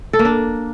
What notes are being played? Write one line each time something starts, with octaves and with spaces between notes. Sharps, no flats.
A4
A#3
D4